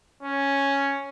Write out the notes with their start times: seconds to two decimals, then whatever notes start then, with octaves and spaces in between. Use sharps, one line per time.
0.23 C#4